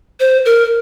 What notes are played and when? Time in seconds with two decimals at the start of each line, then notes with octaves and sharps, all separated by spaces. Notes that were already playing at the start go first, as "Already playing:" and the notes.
0.20 C5
0.45 A#4